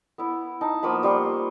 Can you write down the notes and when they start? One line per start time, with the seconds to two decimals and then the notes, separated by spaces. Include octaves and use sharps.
0.18 B3 E4
0.61 D#4 A5
0.83 F3 A#3 B3 B5
1.03 G3 F4 C6 C#6